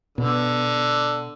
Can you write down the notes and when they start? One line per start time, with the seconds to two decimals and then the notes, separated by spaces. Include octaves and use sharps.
0.18 B2 D3